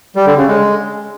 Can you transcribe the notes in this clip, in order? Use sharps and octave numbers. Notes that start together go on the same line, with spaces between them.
G3
D3
C#3
G#3